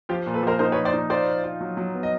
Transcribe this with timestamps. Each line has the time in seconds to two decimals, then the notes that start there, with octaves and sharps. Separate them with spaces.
0.09 F3 F4 G4
0.26 A#2
0.34 A4 B4
0.43 F3 A#4 C5
0.59 D#4 A#4 C5
0.72 B4 C#5
0.77 F3
0.85 C5 D5
0.93 D#4
1.10 F4 C5 D5
1.27 F4
1.44 F4
1.61 F#3
1.77 F#3
1.94 B3
2.03 D#5